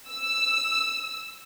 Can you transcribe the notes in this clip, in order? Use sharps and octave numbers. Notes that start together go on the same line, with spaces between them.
E6